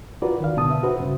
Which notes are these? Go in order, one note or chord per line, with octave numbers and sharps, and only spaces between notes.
F4 F#4 A#4 B4 D5
D#3 F5
C2 B2 D3 A5 D#6
E5
F#4 B4 C5
G2 C#3